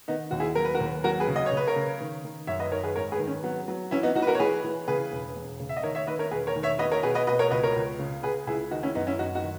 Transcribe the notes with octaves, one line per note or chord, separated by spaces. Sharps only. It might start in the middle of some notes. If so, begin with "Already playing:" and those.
D#3 B3 D#4
D#2 F#4
E4 G#4
F#3 A#4
B4
F#4 A#4
D#2
F#3 F#4 A#4
G#4 B4
C#3
D#5
C#5
C#3
B4
A#4 C#5
C#3
D#3
D#3
F#2 C#5 E5
B4 D#5
D#3 A#4 C#5
G#4 B4
G#2 A#4 C#5
G#4 B4
D#3
C#4
F#3 B3
F#3
E3 C#4 E4
B3 D#4
E3 D#4 F#4
B4
F#4 A#4
C#5
E3 G#4 B4
E3
C#3 G#4 B4
E1
E1
C#3
E5
D#5
D#3 A#4 C#5
C#5 E5
D#3 B4 D#5
A#4 C#5
E1 G#4 B4
A#4 C#5
D#3
C#5 E5
B2 B4 D#5
A#4 C#5
B2 G#4 B4
B4 D#5
B2 B4 D#5
A#4 C#5
C#2 B4 D#5
A#4 C#5
C#2
C#3
C#3 G#4 B4
C#2 E4 G#4
D#3 D#4 F#4
C#4 E4
F#2 B3 D#4
C#4 E4
F#2 D#4 F#4
D#4 F#4
D#3